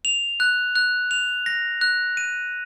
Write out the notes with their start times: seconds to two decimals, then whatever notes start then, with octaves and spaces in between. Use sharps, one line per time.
0.05 F7
0.40 F#6
0.76 F#6
1.11 F7
1.46 A#6
1.81 F#6
2.17 D#7